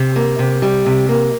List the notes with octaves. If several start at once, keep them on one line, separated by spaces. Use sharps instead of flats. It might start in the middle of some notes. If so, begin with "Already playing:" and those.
Already playing: C3
A#3
C3
G3
C3
A#3